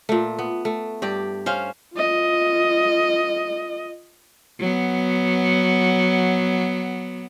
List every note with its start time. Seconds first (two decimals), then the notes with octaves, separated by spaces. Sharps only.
0.09 A#2 A3
0.39 B3
0.65 A3
1.02 G2 G4 D5
1.46 C#4 C5 F5
1.95 F4 D#5
4.59 F#3 B3